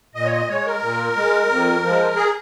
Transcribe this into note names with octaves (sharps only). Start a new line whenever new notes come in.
A#2 D#5
C#5
D#5
G#3 C#5
A#4
A#2
G#3
F2
F3 G#3
G#4